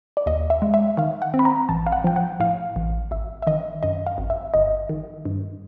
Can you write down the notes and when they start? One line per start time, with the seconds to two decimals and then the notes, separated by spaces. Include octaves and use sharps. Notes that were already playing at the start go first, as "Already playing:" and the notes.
0.17 D5
0.26 D#2 D#5
0.50 E5
0.62 G#3
0.74 E5
0.97 D#3 F5
1.22 F#5
1.34 C4
1.39 B5
1.45 A#5
1.69 A1 A5
1.87 F5
1.92 F#5
2.04 F3 G5
2.16 F#5
2.40 A2 F5
2.76 A1
3.11 G#1 E5
3.42 E5
3.47 D#3 D#5
3.83 F#2 D#5
4.07 F5
4.18 G#1
4.30 E5
4.54 G1 D#5
4.89 D#3
5.25 G2